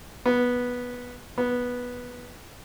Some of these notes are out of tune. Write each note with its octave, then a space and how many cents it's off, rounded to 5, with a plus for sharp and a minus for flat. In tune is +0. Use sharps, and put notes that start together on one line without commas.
B3 -10
B3 -10